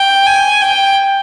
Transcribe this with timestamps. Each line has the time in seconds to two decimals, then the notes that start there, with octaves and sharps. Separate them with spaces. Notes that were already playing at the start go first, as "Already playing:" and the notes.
Already playing: G5
0.26 G#5
0.62 G5